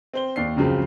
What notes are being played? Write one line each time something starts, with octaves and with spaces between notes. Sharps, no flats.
C4 C5 G7
D#2 D5 C7
C#2 F#2 C#3 F3 F#3 C4